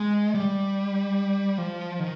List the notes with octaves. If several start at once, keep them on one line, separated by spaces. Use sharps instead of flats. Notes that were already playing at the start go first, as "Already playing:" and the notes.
Already playing: G#3
G3
F3
D#3